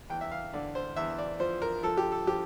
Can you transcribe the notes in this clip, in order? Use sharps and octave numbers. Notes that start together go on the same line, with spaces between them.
E2 G5
E5
F5
D3 D5
C5
E2 E5
D5
F3 C5
A#4
F3 A4
G4
A4
F3 G4